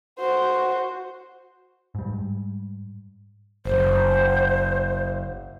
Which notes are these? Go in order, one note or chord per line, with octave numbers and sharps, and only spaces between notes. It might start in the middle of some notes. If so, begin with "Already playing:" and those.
F#4 C5
G#2 G3
F#1 C5